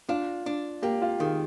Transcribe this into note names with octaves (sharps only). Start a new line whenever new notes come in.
D4 F4 F5
D4
A#3 G4 G5
F4 F5
D#3 G#4